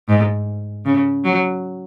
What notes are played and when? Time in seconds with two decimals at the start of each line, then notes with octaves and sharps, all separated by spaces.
0.09 G#2
0.85 C#3
1.25 F#3